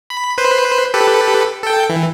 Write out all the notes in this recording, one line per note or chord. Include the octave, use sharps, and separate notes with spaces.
B5
B4 C5
G4 A4 B4
A4 G5
E3